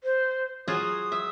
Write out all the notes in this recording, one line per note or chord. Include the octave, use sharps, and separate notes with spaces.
C5
F#3 F4 G#4 D#6
E5